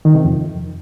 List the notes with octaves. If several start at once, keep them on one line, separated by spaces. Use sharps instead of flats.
D#3
C3
F2